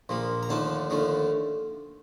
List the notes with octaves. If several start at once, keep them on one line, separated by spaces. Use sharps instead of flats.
A#1 A#2 F3 A#3
A#5
D#2 D3 F3 A3 D4 A5
D#2 D3 F3 A3 D4